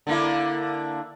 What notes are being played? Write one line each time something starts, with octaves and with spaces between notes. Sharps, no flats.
D3 A#3 E4